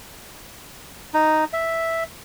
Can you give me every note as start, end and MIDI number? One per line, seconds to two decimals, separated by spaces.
1.14 1.44 63
1.53 2.04 76